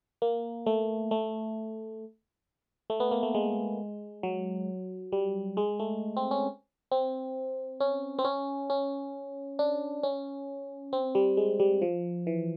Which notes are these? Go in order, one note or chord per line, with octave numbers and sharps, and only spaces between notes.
A#3
A3
A3
A3
B3
A#3
A3
G#3
F#3
G3
G#3
A3
C4
C#4
C4
C#4
C4
C#4
C#4
D4
C#4
C4
G3
G#3
G3
F3
E3